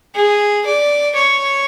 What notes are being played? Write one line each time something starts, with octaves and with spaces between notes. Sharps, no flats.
G#4
D5
C#5